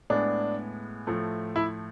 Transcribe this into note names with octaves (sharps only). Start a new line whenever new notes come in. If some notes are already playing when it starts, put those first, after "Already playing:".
A2 G#3 B3 D4
A2 F3 A3
E4